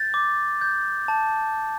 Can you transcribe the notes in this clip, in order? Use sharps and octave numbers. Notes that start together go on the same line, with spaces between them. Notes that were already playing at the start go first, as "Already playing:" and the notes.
Already playing: G6 A6
D6
G6
A5